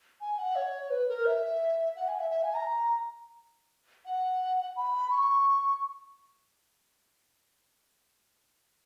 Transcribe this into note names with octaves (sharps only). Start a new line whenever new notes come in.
G#5
F#5
C#5
B4
A#4
E5
F#5
G#5
E5
E5
G#5
A#5
F#5
B5
C#6